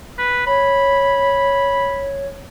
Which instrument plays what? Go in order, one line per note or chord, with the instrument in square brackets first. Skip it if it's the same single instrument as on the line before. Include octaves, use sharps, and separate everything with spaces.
[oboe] B4
[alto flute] C#5 [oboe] B5